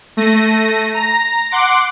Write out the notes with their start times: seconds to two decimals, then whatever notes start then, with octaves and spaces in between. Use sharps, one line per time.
0.17 A3 A#6 D#7
0.94 A#5 A#6
1.51 F#5 C6 D6